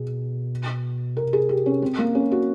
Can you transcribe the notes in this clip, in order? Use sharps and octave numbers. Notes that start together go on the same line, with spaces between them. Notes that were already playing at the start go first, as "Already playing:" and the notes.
Already playing: B2 G#4
C3 A#4
G#4
G4
C#4
C4
A#3
C#4
F#4